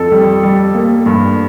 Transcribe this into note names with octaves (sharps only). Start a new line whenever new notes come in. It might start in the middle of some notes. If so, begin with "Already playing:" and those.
Already playing: F2 A4
G3
G3
A#3
G2